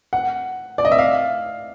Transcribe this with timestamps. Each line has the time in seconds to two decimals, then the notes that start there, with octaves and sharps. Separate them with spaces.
0.13 F#5
0.78 D5
0.85 D#5
0.92 E5
0.99 F5